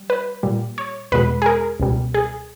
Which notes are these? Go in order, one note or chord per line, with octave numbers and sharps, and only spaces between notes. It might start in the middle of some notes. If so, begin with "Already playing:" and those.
Already playing: G3
B4
A#2 G3
C#5
E2 B2 G#3 B4
G#4
A#4
C#2 B2 G3
G#4